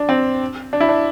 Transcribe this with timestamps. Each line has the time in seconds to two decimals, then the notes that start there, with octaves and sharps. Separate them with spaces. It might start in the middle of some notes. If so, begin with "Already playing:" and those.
Already playing: D4
0.09 C4
0.73 D4
0.80 E4
0.89 D4